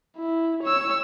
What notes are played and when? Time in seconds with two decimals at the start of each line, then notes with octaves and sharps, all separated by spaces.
0.17 E4
0.63 C#5 E6